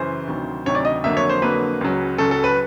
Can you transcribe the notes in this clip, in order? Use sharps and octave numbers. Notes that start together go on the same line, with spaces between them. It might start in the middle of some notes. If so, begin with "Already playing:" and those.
Already playing: F#2 C#3 E3 C5
D2 C3 D#3 F#3
D2 C3 D#3 F#3 C#5
D5
D#5
F2 D3 F#3 A#3 E5
C#5
C5
F2 D3 F#3 A#3 B4
C#2 C#3 F#3
C#2 C#3 F#3 A4
A4
B4